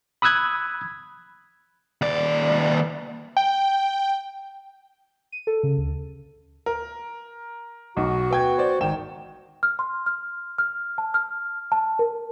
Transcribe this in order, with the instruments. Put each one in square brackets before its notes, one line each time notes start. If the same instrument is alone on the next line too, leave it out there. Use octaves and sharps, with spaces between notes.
[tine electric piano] B5 D#6 E6 F#6 G#6
[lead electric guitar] D#2 D5
[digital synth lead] G5
[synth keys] D#7
A4
C#3
D2
[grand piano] A#4
[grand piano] B1 [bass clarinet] F#4
[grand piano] B3 G5 G#6
C5 D5
[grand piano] G#1 G5 E7 [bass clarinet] D#3
[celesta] F6
C6
F6
F6
A5
F6
A5
A#4